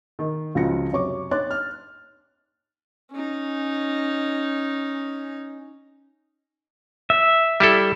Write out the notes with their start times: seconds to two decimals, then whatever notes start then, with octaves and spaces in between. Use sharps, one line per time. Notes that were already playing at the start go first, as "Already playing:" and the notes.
0.19 D#3
0.55 C#2 C#3 F3 F#4 A#6 C#7
0.92 F#2 C3 C#5 C#6 D6
1.31 C#5 C6 D6 F#6 A6
1.51 F6
3.12 C#4 D#4
7.10 E5
7.60 G3 E4 A4